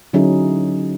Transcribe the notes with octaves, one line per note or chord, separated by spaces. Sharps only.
D3 F#3 C#4 D#4 E4 G#4